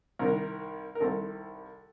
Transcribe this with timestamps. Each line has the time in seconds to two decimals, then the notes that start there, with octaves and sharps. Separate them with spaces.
0.19 C2 C3 D#3 A#4
0.95 A#4
1.00 C2 C3 D#3 A4